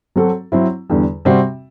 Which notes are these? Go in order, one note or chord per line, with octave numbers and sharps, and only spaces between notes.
F#3 C4 F#4 A4
F#3 C4 E4
E2 D3 G3
C3 G3 C4 F#4